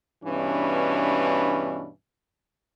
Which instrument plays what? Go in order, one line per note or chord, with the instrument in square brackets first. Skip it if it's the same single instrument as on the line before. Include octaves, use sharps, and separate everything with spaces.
[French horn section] G2 B2 E3 C#4 D4